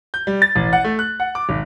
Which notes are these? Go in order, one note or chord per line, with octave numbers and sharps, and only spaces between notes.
G6
G3
A6
A1
F#5
A3
F#6
F#5
D6
G#1